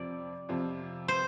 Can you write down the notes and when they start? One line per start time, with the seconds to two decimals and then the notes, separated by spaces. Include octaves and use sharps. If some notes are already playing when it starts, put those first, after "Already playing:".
Already playing: F2 C3 F3 C4 D5
0.49 F2 C3 F3 C4 F4
1.08 C5